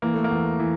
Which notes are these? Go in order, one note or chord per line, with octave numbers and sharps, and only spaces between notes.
E3 A#3
A3
A#3
E2
E3